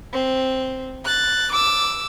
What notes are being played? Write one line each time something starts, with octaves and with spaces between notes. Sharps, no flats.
C4
F#6 A6
D6 E6